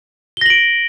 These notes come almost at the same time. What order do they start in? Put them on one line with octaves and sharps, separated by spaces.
G7 A#6 F#7 D7